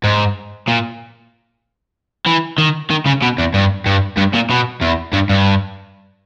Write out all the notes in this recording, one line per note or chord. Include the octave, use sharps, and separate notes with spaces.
G#2
A#2
E3
D#3
D#3
C#3
B2
E2
G2
G2
G2
A#2
B2
E2
G2
G2